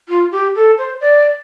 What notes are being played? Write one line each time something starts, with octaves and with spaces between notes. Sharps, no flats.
F4
G4
A4
C5
D5